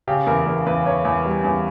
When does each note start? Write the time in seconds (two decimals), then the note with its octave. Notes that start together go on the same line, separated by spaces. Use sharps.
0.08 C#3 G4
0.26 E2 A#4
0.46 E2 A#4
0.66 E2 B4
0.86 E2 C#5
1.05 E2
1.26 G3
1.44 E2